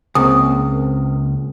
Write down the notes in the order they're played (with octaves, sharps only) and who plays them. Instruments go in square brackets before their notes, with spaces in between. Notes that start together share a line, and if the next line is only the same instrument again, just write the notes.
[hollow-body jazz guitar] C#2 [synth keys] A#3 C4 A#4 [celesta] D#6